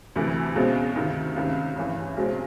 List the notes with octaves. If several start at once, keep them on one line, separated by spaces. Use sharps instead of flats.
D2 C3 E3 A3
C#2 B2 G#3 C4
D2 C3 D#3
C#2 C3 D#3
A1 G2 E3
B1 B2 G#3 C4